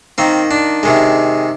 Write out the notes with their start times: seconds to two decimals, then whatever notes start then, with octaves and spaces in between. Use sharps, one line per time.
0.18 D#3 A#3 C4
0.51 D4
0.83 C3 D#3 G#3